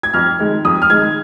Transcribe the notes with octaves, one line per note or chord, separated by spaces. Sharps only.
G#6
F2 F6
D#3 G#3
F2 D#6
F6
D#3 G#3 G#6